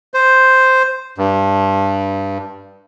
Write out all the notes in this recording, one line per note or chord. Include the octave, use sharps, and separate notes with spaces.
C5
G2